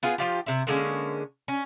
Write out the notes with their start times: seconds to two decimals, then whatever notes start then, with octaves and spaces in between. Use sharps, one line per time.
0.03 B3 F4 G#4
0.18 F3 F4 G4
0.46 C3 E4
0.67 D3 G#3 A#3 C#4
1.48 C#4